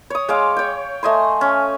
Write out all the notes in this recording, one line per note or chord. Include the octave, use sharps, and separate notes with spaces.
C#5 D#6
G#3 C#5 F5 D6
C#5 G5
A3 D#5 G#5 C6
C#4